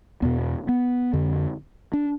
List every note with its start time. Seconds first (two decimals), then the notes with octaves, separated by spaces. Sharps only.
0.22 E2 B2 B3
0.69 B3
1.13 F2 D3
1.93 D4